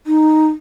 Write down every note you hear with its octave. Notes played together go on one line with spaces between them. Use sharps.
D#4